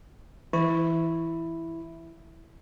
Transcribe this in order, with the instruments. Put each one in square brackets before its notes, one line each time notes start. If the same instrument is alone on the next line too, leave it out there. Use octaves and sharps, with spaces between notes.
[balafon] E3 [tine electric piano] E4